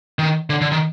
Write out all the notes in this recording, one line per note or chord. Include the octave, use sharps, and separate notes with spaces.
D#3
D3
D3
D#3